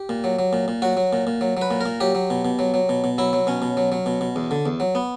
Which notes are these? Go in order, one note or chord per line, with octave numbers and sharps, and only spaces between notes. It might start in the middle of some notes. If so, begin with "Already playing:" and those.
Already playing: G4
A#2
F#3
F#3
A#2
A#2
F#3 F#4
F#3
A#2
A#2
F#3
F#3 B4
A#2
A#2 A#4
F#3 G4
F#3
B2
B2
F#3
F#3
B2
B2
F#3 E4
F#3
B2 C#4
B2
F#3
F#3
B2
B2
E2
D3
E2
F#3
B3